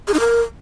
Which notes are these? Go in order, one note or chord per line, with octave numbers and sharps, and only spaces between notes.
G#4
D#4
A#4